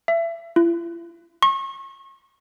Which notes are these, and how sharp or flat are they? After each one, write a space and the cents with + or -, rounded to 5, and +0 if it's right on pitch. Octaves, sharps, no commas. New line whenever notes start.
E5 +30
E4 +45
C#6 -35